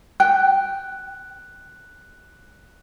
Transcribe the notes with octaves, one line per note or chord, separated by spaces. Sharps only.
G5 F#6